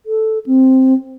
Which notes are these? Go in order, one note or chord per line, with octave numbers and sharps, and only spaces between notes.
A4
C4